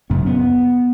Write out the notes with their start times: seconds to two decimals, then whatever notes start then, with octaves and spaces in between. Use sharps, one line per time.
0.10 F#2 C#3 C#4
0.26 B3